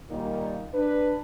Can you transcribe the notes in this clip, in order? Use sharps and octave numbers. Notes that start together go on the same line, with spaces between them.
A#2 D#3 G3 A#3 D#4
D4 B4